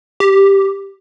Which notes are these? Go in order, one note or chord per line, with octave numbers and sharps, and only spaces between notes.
G4